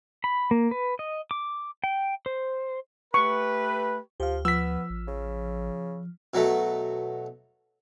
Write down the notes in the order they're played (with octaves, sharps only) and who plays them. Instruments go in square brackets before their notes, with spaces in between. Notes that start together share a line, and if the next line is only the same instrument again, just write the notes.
[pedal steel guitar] B5
A#3
B4
D#5
D6
G5
C5
[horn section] A3 G4 B4 [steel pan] C#6
[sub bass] D2 [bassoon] F3 [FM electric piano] G4 F5
[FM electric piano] F3 [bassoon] B3 [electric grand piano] E6 B6
[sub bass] A1
[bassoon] C#3
[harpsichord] B2 F#3 A3